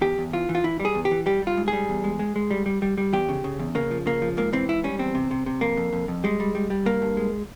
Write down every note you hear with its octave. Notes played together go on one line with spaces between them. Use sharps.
E2 G4
E2
E3 F4
E3
F4
E3 E4
G3
G#4
E2
G4
E3
G3 G4
G3
F4
G#2
G3 G#4
E2
G#3
G#3
G#3
G3
G3
G3
G3
E2 G4
C#3
C#3
E2
C#3 A#3
F3
C#3 A#3
F3
G#2 A#3
E3 C4
G#2 E4
G3 C#4
E2 C4
C3
C3
C3
F2 A#3
F2
F2
F2
G3 G#3
G3
G3
G3
G2 A#3
G2
G#3